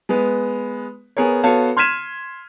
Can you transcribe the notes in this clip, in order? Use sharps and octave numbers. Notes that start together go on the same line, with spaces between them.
G#3 B3 B4
B3 G#4 A#4 C#5
B3 F#4 A4 C#5 F5 A5
C6 F6 G#6 B6 D#7 E7